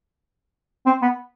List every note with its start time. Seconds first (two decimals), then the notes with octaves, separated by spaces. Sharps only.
0.86 C4
1.02 B3